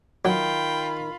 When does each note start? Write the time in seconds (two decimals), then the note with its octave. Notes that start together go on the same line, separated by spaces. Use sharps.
0.25 D#3 F#3 F4 G5 B5